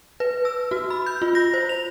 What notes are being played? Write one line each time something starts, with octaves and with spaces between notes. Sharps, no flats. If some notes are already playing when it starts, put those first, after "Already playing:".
B4
E6
F#4
B5
G6
F4
A#6
C5
F7